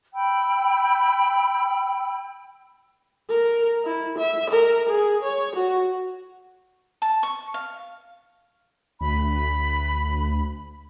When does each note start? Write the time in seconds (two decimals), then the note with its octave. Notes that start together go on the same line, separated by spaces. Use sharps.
0.13 G5 B5 E6
3.30 A#4
3.85 E4
4.18 E5
4.50 A#4
4.89 G#4
5.24 C#5
5.56 F#4
7.02 A5
7.23 C#6
7.54 F5
9.01 D2 B5